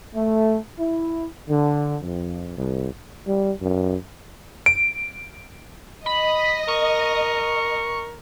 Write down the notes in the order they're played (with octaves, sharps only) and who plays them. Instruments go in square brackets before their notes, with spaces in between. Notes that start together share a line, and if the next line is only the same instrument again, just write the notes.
[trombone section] A3
E4
D3
F2
C2
[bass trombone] G3
F#2
[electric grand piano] D7
[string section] D#5 [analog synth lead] B5
[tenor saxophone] A#4 [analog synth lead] C#6